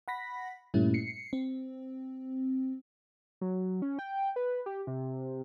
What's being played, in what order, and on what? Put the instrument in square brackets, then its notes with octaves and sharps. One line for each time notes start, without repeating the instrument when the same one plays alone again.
[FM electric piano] F#5 B5 A#6 B6
G2 A#2 G3 A3 C#4 E4
C7 C#7
C4
[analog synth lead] F#3
C#4
G5
B4
G4
C3